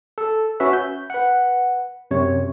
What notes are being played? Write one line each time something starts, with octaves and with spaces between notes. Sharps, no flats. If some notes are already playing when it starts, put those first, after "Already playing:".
A4
C#4 F#4 B4 E5
G6
B4 F#5
F#2 C3 C#5